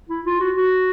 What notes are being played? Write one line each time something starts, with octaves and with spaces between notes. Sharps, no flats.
E4
F4
F#4
F#4